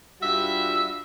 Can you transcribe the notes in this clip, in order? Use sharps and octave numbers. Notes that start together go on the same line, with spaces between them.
G2 G3 F4 F#4 E5